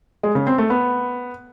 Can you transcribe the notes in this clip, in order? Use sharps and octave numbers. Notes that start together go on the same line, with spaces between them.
G#3
C#3
C4
A3
B3